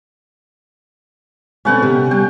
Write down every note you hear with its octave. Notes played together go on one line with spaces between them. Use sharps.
B2 D3 C4 C#4 F#5 G5
C3
G3 G5